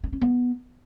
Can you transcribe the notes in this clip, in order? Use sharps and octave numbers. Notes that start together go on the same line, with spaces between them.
D4
C#4
B3